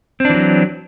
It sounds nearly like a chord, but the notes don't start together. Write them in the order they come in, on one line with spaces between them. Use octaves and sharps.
C4 D4 E3 F#3